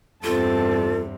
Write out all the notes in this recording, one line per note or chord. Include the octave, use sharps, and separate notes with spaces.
E2 G2 C3 C4 F4 A4 A5